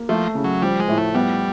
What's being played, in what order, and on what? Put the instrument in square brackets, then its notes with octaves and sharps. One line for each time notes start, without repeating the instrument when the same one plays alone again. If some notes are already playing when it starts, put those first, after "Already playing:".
Already playing: [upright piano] A#3
[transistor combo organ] F3 [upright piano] A3
[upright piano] C#3
[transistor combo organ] F#3
[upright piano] F3 [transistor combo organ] G3
[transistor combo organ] G#3
[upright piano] A2
[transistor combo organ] A3
[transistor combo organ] G3 [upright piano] B3